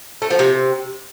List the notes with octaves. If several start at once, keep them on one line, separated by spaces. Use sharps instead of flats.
A3
F3
C3